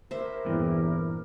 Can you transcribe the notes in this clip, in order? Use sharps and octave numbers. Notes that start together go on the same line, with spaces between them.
E4 G4 A#4 C5 E5
E2 G2 A#2 E3